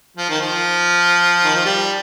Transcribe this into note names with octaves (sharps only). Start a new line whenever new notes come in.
F3
D#3
F3
D#3
F3
G3